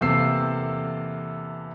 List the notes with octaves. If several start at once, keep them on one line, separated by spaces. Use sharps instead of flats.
E2 C3 A#3 A4 E6 C7